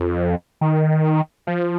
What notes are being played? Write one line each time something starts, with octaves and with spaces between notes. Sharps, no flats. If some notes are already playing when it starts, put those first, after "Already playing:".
Already playing: F2
D#3
F3